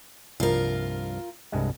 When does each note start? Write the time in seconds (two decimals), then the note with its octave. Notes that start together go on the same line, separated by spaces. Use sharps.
0.40 C2 G2 F3 F4 A#4
1.52 C2 G2 G#3